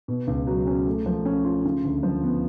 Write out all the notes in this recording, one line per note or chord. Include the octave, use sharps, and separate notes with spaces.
B2
C#2
F#3
C#4
A3
F3
C#4
F4
C#3
D2
F3
B3